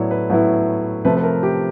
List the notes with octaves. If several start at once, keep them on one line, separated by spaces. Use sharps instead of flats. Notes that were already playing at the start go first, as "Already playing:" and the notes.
Already playing: A2 F#3 B3 E4 C#5 D5
B4
A2 F#3 B3 E4
C3 F3 A3 B4
B4
A#4
G4